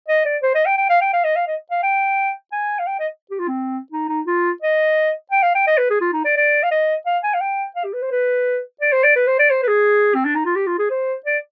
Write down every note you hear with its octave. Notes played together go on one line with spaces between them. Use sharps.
D#5
D5
C5
D#5
G5
G5
F5
G5
F5
D#5
F5
D#5
F5
G5
G#5
F5
G5
D#5
G4
F4
C4
D#4
D#4
F4
D#5
G5
F5
G5
D#5
B4
G#4
F4
D#4
D5
D5
F5
D#5
F5
G#5
F5
G5
F5
G4
B4
C5
B4
D5
C5
D5
B4
C5
D5
C5
B4
G#4
C4
D4
D#4
F4
G4
F4
G#4
C5
D5